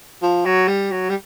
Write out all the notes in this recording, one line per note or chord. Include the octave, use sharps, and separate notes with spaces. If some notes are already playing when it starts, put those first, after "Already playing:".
F3
F#3
G3
F#3
G3